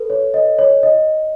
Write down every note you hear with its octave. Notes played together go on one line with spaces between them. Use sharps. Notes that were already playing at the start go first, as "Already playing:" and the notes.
Already playing: A4 B4
C#5
D#5
C#5
D#5